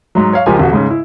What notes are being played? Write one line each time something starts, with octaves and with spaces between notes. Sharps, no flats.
G#2 F#3
C#5 F5
C#2 F3 G#3 G4 A#4 G#5
D#1 F#4
G#2 C#3
E4